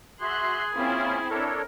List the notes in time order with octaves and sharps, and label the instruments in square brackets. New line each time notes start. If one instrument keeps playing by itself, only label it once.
[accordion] F#4 E5 [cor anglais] G#4 [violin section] C6 F#6
[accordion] A#3 C#4 F4 [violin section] C4 E4
[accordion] D4 A4 C#5 [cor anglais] A#4